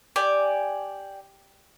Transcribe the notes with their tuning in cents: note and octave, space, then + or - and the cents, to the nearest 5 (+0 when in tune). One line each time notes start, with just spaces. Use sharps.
G4 +0 D5 +0 G#5 +0